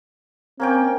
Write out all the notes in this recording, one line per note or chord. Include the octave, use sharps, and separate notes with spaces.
A#3 C4 C#4 G5